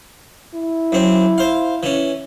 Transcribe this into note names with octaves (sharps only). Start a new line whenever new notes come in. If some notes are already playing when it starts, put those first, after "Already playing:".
E4
F#2 C4
C5 F5
E3 C#4